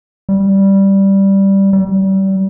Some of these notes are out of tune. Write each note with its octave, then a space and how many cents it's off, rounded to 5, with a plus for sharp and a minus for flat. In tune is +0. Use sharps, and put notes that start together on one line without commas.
G3 -5
G3 -30